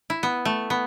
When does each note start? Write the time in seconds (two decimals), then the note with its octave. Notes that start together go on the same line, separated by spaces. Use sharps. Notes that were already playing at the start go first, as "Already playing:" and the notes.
0.10 E4
0.23 B3
0.45 A3
0.70 B3